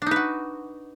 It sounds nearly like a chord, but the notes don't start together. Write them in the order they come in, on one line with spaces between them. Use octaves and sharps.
D4 D#4 B4 F#4